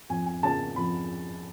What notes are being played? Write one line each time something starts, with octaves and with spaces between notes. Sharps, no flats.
F2 G#5
G#5
C#3 F3 A#3 C#4 A5
F2 B5